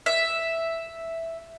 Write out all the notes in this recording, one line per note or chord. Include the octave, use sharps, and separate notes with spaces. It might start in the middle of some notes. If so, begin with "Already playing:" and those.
E5